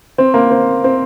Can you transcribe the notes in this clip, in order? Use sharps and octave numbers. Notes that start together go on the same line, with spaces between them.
C4
A#3
C4
C4